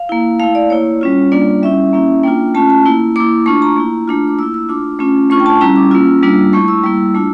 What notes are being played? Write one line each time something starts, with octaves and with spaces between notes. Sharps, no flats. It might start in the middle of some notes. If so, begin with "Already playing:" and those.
Already playing: F5
A#3 E4
A3 E4 F5
D5
A#3 E4 C#5
G3 C#4 F4
G3 A#3 D4 F4 D5
G3 C#4 E4 E5
A#3 C#4 E4
A#3 D4 F4 G5
A3 C#4 F4 A5
A5
A#3 E4
A#3 E4 D6
A3 D4 F4 C#6
A#5
A#3 E4
A3 D4 F4
D6
A#3 E4 E6
E6
A3 D4 F4 D6
A3 C#4 F4
A3 D4 F4 C#6
G5
A5
G3 C#4 E4 A#5
D6
A#3 C#4 F4 E6
G3 A#3 D4 F4
A3 E4 C#6
E6
G3 A#3 E4 E6
A3 D4 F4